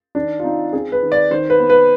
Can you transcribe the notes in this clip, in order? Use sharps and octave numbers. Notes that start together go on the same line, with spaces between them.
D#3 D4
F4
C4 D#4
C4 G#4
B4
D#3
D5
D#3 C5
B4
B3
B4